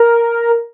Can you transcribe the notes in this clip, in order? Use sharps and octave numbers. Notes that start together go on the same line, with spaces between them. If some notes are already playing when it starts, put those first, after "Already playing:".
Already playing: A#4